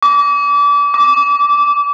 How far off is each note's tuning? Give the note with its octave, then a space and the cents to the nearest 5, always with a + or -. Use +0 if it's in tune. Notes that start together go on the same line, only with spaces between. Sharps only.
D6 -30
D6 -15